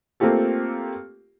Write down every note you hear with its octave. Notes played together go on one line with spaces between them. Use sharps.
A3 A#3 C4 F4 G4 A4